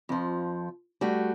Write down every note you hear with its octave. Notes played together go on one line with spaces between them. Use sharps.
F2 F3
G3 A3 F#4